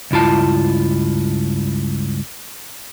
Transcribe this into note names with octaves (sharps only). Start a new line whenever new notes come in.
C#2 G2 E4 F4 A5